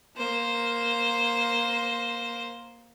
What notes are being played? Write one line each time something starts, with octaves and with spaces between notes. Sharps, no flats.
A#3 C5